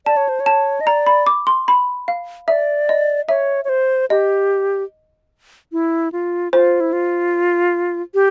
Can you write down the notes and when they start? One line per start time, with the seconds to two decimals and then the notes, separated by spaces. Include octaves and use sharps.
0.06 D5 A5
0.17 C#5
0.29 C5
0.40 C#5
0.46 A5
0.81 D#5
0.87 D5 A#5
1.06 B5
1.26 D6
1.47 C6
1.68 B5
2.08 F5
2.48 D5 E5
2.89 D#5
3.29 C#5 E5
3.65 C#5
3.69 C5
4.10 G4 D#5
5.72 E4
6.12 F4
6.52 F4 C5
6.80 E4
6.93 F4
8.14 G4